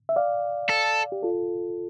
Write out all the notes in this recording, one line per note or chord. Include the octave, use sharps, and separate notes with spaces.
E5
D5 F5
A4
G4
F4 A4